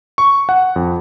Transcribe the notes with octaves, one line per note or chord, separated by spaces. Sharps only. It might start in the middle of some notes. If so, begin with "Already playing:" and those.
C#6
F#5
F2